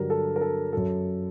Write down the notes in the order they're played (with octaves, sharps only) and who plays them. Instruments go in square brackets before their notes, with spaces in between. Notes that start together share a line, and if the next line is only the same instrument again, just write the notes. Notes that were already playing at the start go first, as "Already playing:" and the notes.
Already playing: [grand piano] G2 D3 F#3 A#4
A4
A#4
A4
F#2 F#3 A4